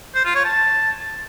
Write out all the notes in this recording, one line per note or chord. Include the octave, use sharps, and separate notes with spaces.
C5
F4
C#5
A5